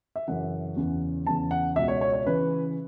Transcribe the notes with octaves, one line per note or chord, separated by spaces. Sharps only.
E5
F#2 C#3 E3 F#5
E2 C#3 E3
E2 C#3 E3 A5
F#5
C#2 B2 E5
C#5
C#5
C#5
C#3 E3 B4